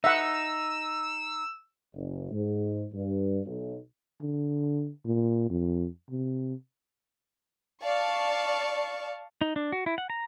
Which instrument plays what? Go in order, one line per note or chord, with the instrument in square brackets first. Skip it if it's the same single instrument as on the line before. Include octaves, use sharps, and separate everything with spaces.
[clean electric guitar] D#4 [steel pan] E5 F#5 [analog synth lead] E6
[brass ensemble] F#1
G#2
G2
B1
[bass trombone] D3
A#2
F2
C3
[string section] D5 F5 A5 C#6
[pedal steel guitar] D#4
D4
F#4
E4
F#5
A#5